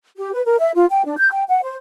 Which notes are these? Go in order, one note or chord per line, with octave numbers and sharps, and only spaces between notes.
G4
B4
A#4
E5
F4
G5
D4
G6
G5
F#5
C5